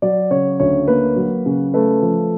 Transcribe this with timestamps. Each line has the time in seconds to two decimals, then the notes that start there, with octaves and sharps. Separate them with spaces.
0.02 F#3 D5
0.31 C#3 C#5
0.60 D2 C#5
0.88 A#3 B4
1.16 F#3
1.46 C#3
1.74 A3 B4
2.02 F3